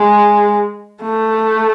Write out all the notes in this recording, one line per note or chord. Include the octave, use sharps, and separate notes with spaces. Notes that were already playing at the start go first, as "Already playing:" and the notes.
Already playing: G#3
A3